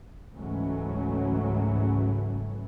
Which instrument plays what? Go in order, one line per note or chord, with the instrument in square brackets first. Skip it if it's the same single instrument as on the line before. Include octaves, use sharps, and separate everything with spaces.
[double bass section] C#2 G#2 E3 F#3 A3 C#4